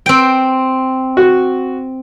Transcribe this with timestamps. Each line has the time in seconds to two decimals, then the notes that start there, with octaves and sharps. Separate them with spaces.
0.06 C4 G5
1.17 F#4